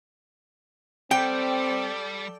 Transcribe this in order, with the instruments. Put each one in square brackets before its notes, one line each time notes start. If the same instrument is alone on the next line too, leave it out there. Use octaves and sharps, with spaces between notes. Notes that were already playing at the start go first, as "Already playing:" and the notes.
[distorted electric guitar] G3 [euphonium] C4 [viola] A4 D5 [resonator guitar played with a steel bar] G5